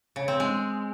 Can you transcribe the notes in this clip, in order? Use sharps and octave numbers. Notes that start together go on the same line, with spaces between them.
C#3
C4
G#3